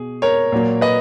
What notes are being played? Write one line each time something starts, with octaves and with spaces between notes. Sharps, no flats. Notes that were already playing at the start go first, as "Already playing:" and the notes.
Already playing: B2 G#4
A#4 C#5
A#2 F#3 A#3
B4 D#5